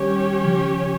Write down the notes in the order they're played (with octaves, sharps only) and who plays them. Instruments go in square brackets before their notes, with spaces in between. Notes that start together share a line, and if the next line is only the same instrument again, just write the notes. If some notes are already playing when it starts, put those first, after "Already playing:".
Already playing: [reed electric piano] D#3 G3 [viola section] C#4 G4 C#5
[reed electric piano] C#3 F3